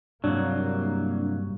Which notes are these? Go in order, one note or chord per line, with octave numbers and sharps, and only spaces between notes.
C2 G2 F#3 A#3 D4